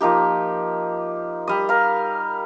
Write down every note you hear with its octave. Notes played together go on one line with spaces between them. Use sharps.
F3 A#3 D#4 G4
G3 D#6
A#4 F5